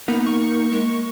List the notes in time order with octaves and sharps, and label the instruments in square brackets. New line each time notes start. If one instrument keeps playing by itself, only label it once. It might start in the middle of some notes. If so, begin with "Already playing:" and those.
[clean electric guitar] A#3 [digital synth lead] B3 [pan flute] D#4
[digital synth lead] C#6
[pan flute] G#3